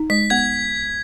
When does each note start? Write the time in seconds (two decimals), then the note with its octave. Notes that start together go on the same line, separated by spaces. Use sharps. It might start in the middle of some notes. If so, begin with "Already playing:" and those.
Already playing: D#4
0.10 G#3 B6
0.30 B3 G#6